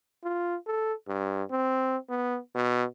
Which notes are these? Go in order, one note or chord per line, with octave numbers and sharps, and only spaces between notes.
F4
A4
G2
C4
B3
B2